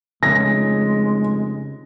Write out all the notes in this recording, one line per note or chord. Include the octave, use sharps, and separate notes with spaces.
F1 C#3 G#3 A#6